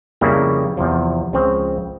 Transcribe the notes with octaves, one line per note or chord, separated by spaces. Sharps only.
F2 C#3 G3 A#3 E4
E2 C3 F3
C#2 C#3 F3 C4